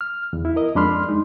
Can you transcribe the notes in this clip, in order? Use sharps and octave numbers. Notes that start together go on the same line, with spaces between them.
F6
E2
E4
A#4 D#5
F2 G#3 D4 B5 C6 F6
G#3 D#4